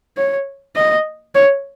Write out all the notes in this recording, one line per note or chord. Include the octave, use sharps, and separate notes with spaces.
C#5
D#5
C#5